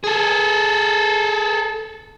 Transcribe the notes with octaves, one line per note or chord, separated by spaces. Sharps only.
G#4 A4